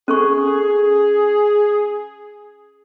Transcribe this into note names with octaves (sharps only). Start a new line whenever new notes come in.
C#4 G#4 A4 C#6